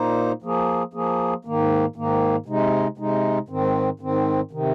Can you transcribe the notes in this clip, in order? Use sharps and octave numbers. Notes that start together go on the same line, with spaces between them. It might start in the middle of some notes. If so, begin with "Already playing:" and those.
Already playing: A#2 A#3 D#4 C5
F3 A#3 G#4
F3 A#3 G#4
G#2 D#3 A#3
G#2 D#3 A#3
C3 G#3 D#4
C3 G#3 D#4
G#2 D#3 C4
G#2 D#3 C4
C3 D#3